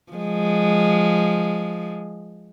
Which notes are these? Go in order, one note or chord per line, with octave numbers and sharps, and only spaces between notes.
F3 G#3